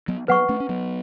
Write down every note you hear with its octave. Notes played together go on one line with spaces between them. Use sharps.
F#3 B3
F#3 B3 B4 F#5 C#6
A3 C#4
C#4
F#3 B3